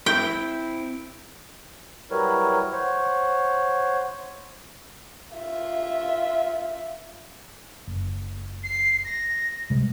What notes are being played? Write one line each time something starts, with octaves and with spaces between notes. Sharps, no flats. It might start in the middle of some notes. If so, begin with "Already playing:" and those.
C4 E4 G5
F#3 G3 E4 A#4 B4 C#5
C5 C#5 F#5
F4 E5
F#1
C7
A#6
C3 G3 G#3